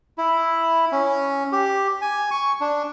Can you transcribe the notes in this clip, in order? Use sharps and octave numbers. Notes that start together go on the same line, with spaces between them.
E4
C#4
G4
G#5
C#6
D4